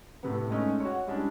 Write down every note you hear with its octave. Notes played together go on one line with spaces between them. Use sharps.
A2 C3 B3
G#3 A3 C#4 D#4
F#4 C#5
G3 G#3 C#4 D4 E4